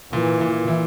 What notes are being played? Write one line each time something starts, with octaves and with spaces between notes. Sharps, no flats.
A#2 E3
A#2
E4